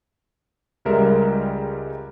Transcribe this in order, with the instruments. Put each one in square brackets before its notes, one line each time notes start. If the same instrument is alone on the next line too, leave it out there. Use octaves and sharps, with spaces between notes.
[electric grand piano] C#2 G3 G#3 A#4 E5